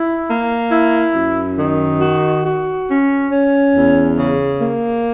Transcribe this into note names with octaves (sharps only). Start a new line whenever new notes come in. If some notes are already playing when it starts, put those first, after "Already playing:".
Already playing: E4
A#3
E4
F#2
D#3
F#4
F#4
C#4
C#4
E2
C#3
A#3